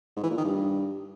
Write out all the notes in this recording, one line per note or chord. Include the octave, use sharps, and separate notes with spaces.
G#2
E3
A#2
D#3
G2